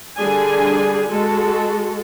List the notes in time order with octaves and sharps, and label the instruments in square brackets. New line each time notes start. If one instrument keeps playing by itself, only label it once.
[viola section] D3 G3 D4 G#4 G#5
G#3 F#4 A4